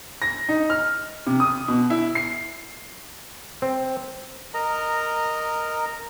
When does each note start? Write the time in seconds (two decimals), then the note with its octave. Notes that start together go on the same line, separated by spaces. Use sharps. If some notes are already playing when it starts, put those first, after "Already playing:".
0.22 A#6
0.49 D#4
0.70 F6
1.27 C3
1.40 D#6
1.68 B2
1.90 E4
2.15 C7
3.62 C4
4.54 A#4 D#5 A#5